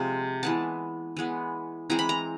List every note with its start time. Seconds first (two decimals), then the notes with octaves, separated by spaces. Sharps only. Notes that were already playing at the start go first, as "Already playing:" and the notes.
Already playing: C3 F3 G#3
0.43 E3 G#3 B3 A5
1.17 E3 G#3 B3
1.90 E3 G#3 C4 A#5
1.99 B5
2.09 A#5